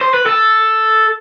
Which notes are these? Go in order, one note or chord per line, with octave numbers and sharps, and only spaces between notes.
C5
B4
A4